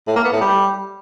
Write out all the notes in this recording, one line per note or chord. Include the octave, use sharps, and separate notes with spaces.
A2
A#3
B3
A2
G3